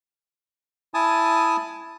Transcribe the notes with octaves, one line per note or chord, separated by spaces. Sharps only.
E4 G#5 A5 D#6